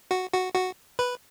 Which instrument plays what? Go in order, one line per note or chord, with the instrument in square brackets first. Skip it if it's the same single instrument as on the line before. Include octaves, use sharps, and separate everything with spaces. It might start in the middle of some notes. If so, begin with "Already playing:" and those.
[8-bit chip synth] F#4
F#4
F#4
B4